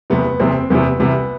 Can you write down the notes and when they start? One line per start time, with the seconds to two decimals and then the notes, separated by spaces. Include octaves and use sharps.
0.10 F#1 E2 C3 B3
0.40 F#1 E2 C3 C4
0.70 F#1 E2 C3 B3
0.99 C2 C3 E3 B3